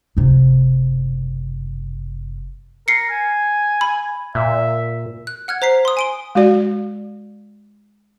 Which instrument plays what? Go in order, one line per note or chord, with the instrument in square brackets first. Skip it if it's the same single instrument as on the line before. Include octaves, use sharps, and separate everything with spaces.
[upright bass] F#1 C3
[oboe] A#4 [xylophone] C7 C#7
[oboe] G#5
[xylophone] B5
[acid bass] A#2 [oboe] E5
[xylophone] F#6
F#5 F6 F#6 G#6
C5 A#5 B6 C7
C6 D#6
G#5 D7 G7
[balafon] G#3 F#4 D5